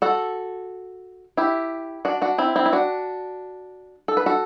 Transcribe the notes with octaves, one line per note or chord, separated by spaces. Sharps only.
F#4 A4
E4 G4
D4 F#4
D4 F#4
C4 E4
C4 E4
E4
D4 F#4
A4
B4
F#4 A4